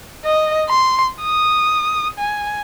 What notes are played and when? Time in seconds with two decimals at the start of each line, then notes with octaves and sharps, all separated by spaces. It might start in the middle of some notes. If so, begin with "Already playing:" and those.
0.25 D#5
0.69 C6
1.22 D#6
2.19 G#5